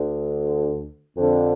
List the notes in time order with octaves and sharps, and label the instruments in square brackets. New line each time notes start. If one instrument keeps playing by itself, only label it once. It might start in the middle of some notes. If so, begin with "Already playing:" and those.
Already playing: [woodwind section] D2 D3
F2 D3